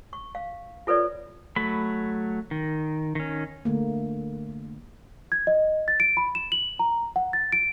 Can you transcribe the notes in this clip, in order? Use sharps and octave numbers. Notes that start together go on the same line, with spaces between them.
C#6
F5
F4 A4 B4 C#5 D5
F#3 A3 B5
D#3
D#3 C#4
D3 A3 A#3
G#6
D#5
A6
D7
B5
E7
F#7
A#5
F#5
A6
D7